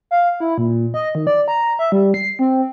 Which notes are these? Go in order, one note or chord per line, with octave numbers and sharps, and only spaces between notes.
F5
E4
A#2
D#5
D#3
D5
A#5
E5
G3
C7
C4